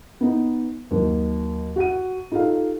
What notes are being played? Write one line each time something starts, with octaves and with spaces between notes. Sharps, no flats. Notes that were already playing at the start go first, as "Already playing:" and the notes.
B3 D#4
D#2 F#3
F#4 F#5 D#7
D#4 F4 G4 A4 F5